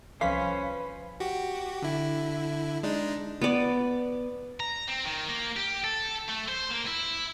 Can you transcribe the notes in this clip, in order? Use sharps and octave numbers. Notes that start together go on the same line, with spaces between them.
C2 F3 C#4 B4 C5 F5 C6 B6
F#4 G4
D3 E4
G#3 D4 D#4
B3 D5
A#5
C4
D#3
A#3
G4
A4
A3
C5
A#3
E4